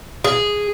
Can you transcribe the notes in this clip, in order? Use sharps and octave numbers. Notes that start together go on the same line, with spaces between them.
G#4